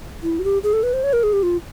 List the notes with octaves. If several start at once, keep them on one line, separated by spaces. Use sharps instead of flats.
E4
F#4
G4
G#4
A4
B4
C5
C#5
A#4
G#4
G4
F4